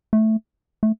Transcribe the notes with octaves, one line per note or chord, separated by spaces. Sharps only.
A3
A3